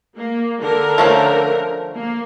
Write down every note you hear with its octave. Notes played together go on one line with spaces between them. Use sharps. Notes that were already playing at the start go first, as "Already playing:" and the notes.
A#3
D3 A#4
F3 A3 C#4
A#3